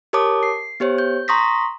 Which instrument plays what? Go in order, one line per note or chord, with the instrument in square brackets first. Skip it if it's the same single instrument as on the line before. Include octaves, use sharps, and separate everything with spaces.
[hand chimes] G4 A#4 C#5 A5 D6 D#6
C7
B3 G4 C5 C#5
G6
A#5 C6 C#6 D#6 A#6 B6